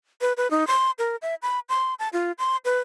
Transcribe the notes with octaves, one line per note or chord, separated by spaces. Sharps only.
B4
B4
D#4
C6
A#4
E5
B5
C6
A5
F4
C6
B4